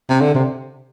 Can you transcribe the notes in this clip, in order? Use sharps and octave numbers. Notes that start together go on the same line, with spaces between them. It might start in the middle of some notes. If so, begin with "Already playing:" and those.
C3
D3
C3